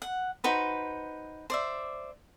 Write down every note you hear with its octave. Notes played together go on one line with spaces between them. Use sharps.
F#5
D#4 F#4 B4 C5
C5 D5 E5